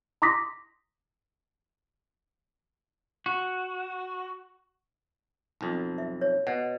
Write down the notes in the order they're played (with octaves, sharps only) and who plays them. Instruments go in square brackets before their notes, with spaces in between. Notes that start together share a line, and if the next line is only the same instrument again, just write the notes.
[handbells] A#5 C6 D6 D#6 A#6 B6
[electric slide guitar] F#4
[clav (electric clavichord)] B1 F2
[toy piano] E5
C#5
[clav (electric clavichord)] B2 [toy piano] F#5